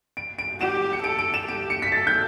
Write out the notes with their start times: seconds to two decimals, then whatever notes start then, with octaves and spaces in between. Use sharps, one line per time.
0.17 D7
0.38 D7
0.60 G4 E7
0.93 C#7
1.04 A4 D7
1.19 D7
1.34 E7
1.49 G4 D7
1.70 C#7
1.82 B6
1.92 A4 A6
2.07 G6